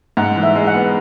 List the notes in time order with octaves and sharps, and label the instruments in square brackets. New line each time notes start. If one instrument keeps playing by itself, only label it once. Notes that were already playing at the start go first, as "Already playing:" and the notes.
[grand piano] G#2 [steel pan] F#5
[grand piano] E3
[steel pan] E5
[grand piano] G#3
[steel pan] F#5
[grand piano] B3